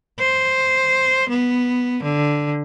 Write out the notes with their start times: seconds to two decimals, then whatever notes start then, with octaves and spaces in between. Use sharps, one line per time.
0.19 C5
1.30 B3
2.03 D3